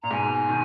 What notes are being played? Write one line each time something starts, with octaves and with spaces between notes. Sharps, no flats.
A#2 A#5
G#2 B2 G#5
B2 D#3